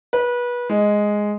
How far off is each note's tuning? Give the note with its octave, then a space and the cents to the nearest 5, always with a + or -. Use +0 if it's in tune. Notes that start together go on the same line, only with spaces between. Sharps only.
B4 -25
G#3 +0